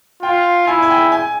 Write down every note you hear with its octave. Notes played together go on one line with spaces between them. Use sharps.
F4 G5
E4 G#5
G#5
G5
G#5